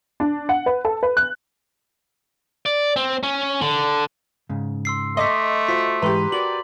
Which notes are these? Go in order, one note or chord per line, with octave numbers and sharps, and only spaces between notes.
D4
F#5
B4
A4
B4
F#6
D5
C4
C#4
D3
G#2 C#3
C6 E6 C7
A3 D#5 C6 D6 B6
F4 F#4 C5 B6
G#2 E3 G#3 G4 B4 A#5 C6
F#4 A#4 D5 F#7